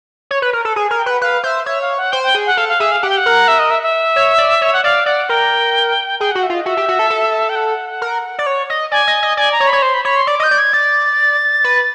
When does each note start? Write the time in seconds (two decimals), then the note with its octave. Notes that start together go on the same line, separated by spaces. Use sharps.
0.31 C#5
0.42 B4
0.53 A#4
0.65 A4
0.76 G#4 G#5
0.87 A#4 G#5
0.99 G5
1.06 B4 F#5
1.21 B4 F5
1.43 C5 E5
1.66 C#5 E5
1.82 F5
1.97 F#5
2.12 C5 G5
2.23 G5
2.35 G#4
2.46 F#5
2.57 A4 F5
2.69 F5
2.80 G#4 E5
2.92 F5
3.03 G4 F#5
3.09 G5
3.17 F#5
3.26 A#4
3.48 E5
3.59 D#5
3.71 E5
3.82 E5
4.16 C#5
4.38 D5
4.62 C#5
4.73 F#5
4.84 D5 F5
5.06 D5 F#5
5.29 A#4 G5
6.20 G#4 G5
6.31 F#4 F#5
6.43 E5
6.50 F4 D#5
6.65 F#4 E5
6.77 G4
6.88 F#4
6.99 A4
7.10 A4
7.49 G5
7.55 F#5
8.02 A#4
8.39 D5
8.46 C#5
8.70 D#5
8.91 D5 G#5
9.07 D#5
9.23 D#5
9.37 D5 G#5
9.52 A#5
9.60 C#5
9.67 B5
9.73 C#5
9.82 C5 C6
9.94 B5
10.05 C#5 B5
10.16 C6
10.27 D5 D6
10.40 D#5
10.43 G6
10.51 D5
10.58 G#6
10.73 D5 A6
11.64 B4